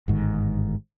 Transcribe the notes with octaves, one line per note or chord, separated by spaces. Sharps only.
G1 G#2 D#3